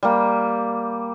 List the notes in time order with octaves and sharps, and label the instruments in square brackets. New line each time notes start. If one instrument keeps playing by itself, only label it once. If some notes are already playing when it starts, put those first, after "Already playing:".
[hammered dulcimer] G3 A#3